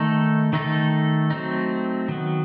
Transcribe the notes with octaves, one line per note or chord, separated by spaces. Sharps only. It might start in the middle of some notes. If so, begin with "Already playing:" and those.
Already playing: D#3 A3 D#4 A4
D#3 A3 D#4 A4
F#3 A3 C4 D#4
D#3 F#3 B3